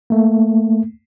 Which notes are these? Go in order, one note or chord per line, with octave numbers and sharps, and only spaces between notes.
A3 A#3